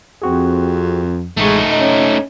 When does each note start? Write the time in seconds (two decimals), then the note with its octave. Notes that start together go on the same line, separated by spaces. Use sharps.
0.22 F2 C4 F#4 G#4
1.37 A1 G#3 A3 D#4 C#6
1.72 C#4 D#5 A#5